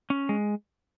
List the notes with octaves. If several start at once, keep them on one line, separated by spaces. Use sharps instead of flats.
C#4
G#3